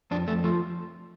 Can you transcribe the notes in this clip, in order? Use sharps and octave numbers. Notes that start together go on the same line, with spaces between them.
F2 D4
F2 A3
F3 A3